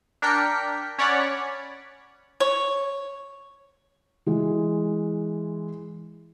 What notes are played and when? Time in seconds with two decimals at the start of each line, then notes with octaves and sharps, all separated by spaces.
0.22 D4 A#4 G5 B6 C#7
0.98 C#4 C#5 D5 F#5 B5
2.40 C#5
4.26 E3 G#3